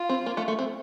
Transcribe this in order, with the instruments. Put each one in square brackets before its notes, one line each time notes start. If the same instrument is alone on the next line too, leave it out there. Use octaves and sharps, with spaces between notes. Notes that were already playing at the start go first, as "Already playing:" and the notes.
Already playing: [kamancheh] F4
[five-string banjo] C4
A#3
A3
A3
C4